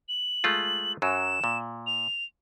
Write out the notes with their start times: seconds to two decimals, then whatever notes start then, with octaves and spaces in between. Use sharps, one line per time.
0.08 F#7
0.44 G#3 A3 F4
1.02 F#2 F#3 E7
1.44 A#2
1.86 F7